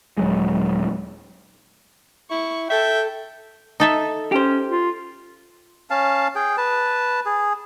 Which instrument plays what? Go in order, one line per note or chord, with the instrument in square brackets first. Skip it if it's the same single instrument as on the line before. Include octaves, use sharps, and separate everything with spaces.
[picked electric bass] D#1 F#3 G#3
[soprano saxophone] E4 [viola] C#6
[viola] A4 [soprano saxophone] E5 [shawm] G5
[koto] D#4 A4 E5
[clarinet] C#4 [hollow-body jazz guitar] G4 C5
[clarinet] F4
[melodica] C#4 F5 A5
G#4 G5
B4 A5
G#4